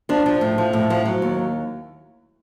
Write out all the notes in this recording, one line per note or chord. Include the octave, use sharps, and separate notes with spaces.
F3 D4
F3
A2
F3
A2
F3
F#3
D#2